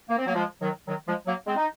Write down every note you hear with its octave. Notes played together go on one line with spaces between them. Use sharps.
A#3
C4
F#3 A#3
F3 G#3
D#3 F#3
D#3 F#3
F3 G#3
F#3 A#3
G#3 C4
D#4